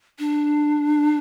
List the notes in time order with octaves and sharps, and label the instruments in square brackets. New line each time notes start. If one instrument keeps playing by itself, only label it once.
[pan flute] D4